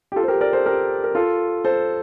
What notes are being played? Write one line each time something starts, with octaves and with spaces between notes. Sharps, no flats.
G4
F4 A4
C5
G4 A#4
A#4 D5
A4 C5
G4 A#4
A#4
F4 A4
A4 C5